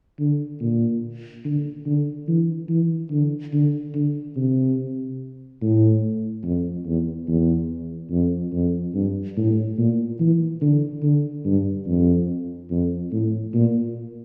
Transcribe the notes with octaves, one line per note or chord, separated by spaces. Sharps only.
D3
A#2
D3
D3
E3
E3
D3
D3
D3
C3
A2
F2
E2
E2
F2
F2
G2
A2
A#2
E3
D3
D3
G2
F2
F2
A2
A#2